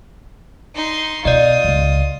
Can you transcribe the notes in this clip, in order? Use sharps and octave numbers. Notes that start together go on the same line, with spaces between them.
D#4 C6
B2 F4 D5 D#5 D#6
C#2